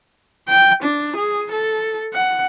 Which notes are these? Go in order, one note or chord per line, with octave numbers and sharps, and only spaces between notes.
G5
D4
G#4
A4
F#5